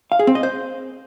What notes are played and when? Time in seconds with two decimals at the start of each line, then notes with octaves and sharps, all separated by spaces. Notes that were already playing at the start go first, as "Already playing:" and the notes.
0.12 F5
0.19 G#4
0.27 C4
0.35 D#5
0.43 C5